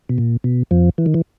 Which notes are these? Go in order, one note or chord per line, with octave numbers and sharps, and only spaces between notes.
B2
A#2
B2
F2 F3
E3
D#3
E3